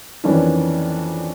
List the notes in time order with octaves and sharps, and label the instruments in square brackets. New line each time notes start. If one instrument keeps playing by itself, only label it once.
[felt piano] F2 D#3 E3 A#3 C#4 D4